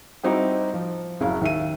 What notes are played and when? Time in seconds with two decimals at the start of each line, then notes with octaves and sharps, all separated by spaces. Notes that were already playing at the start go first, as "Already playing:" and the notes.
0.23 G3 C4 D#4 E4 F#4 G4
0.74 F3
1.20 F#1 C#3 F#3 E4 F5
1.41 D#2 E5 D#7